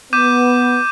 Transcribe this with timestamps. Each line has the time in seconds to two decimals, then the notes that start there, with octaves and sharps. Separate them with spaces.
0.13 B3 D6 G6 D#7